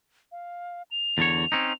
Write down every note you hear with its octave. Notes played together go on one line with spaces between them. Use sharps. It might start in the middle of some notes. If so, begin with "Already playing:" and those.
F5
F7
E2 D3 C#5
C4 C#4 D#4